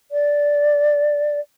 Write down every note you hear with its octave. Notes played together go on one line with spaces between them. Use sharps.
D5